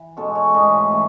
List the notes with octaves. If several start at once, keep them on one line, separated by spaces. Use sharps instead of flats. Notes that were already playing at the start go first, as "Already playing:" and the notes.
Already playing: E3
B2 G#3 C#4 A4
C#5
G#2 E3 A3 C#4 D#5
E3 A3 C#4